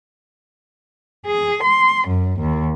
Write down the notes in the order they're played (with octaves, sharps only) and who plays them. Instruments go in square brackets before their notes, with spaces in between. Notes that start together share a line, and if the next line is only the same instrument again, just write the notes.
[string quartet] G#4
C6
F#2
D#2